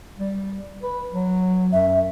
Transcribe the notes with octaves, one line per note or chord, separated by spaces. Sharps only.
G3
B4
F#3
F#2 E5